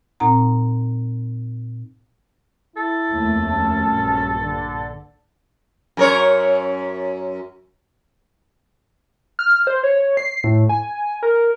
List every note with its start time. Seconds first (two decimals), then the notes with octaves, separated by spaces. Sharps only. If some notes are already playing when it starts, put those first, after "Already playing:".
0.20 A#2 C4 D#4 F#5 A#5
2.77 E4 A4
3.11 F1 D#2 A3
3.44 F#2 C#4 A5
3.90 A#1 G2
4.42 D3
5.97 F#2 A#4 C#5
9.39 F6
9.67 C5
9.83 C#5
10.17 C7
10.44 A2
10.69 G#5
11.23 A#4